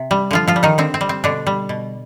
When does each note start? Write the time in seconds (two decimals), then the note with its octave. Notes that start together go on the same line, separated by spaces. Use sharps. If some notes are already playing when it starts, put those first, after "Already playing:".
Already playing: C3
0.11 G3
0.31 D3 F3 F4
0.47 F3 F4
0.56 G3
0.63 D#3 D#4
0.78 D3 C4
0.94 C4
1.01 G3
1.09 C4
1.24 B2 D3 D4
1.46 G3
1.69 B2